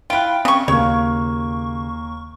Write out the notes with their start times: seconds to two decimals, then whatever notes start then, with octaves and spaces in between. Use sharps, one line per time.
0.10 E4 F4 G5 F#6 D7
0.45 C#3 C4 C#6 D#6
0.68 D#2 C#3 A#3 C#5 C#6